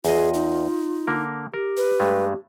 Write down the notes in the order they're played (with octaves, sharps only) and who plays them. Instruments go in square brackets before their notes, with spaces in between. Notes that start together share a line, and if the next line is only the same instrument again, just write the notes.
[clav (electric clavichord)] E2 D#5 [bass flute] F4 [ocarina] G#4
[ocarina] D#4
[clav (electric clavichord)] D3 A#3 A#4
[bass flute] G4 [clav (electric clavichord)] A#4
[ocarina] B4
[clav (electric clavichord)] G2 G#3 A3